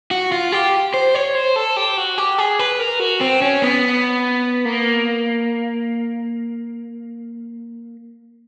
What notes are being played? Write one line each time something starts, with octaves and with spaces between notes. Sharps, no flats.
F#4
F4
G4
C5
C#5
C5
A4
G4
F#4
G4
G#4
B4
A#4
F#4
C4
C#4
B3
A#3